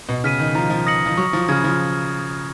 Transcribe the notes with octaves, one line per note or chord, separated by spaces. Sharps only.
B2
C#3 F6 B6 D#7
D#3
F3 A#5
F3
D#6 A#6 C#7 F#7
F3
F#3 C#6
F3
C#3 F6 G#6
F3